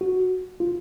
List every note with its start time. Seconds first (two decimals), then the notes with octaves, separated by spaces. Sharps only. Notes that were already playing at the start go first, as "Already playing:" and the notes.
0.01 F#4
0.60 F4